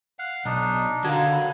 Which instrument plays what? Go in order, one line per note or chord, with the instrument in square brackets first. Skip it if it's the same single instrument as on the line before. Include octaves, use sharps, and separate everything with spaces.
[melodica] F5 F#5
[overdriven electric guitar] B1 [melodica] D4 D#4
[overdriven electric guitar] D3 [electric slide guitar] F#4 A#4 F5 [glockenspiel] A5 A#5 G#6
[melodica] F#3 [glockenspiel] B5